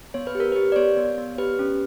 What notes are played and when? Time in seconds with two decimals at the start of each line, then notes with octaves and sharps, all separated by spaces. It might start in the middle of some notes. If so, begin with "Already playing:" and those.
0.14 B3 C#5
0.27 B4
0.35 G4
0.40 A#4
0.52 G4 B4
0.72 D5
0.76 B3 C#5
0.97 B3
1.18 B3
1.38 G4 B4
1.59 C#4